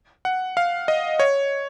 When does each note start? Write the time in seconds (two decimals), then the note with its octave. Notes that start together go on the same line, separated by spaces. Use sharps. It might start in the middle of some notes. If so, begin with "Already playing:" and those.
0.25 F#5
0.57 F5
0.88 D#5
1.20 C#5